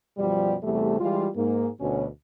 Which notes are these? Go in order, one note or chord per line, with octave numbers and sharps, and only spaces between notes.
F#2 B2 F3 G3
E2 C3 G3 A3
E3 G3 G#3 F4
G#2 A#3
D2 B2 C#4